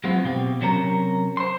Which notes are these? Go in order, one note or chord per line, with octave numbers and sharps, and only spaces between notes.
F#3 G#3 B3 C4 F4
B2 C4 G4
C3 F#3 C#4 A#4 A#5
C5 C6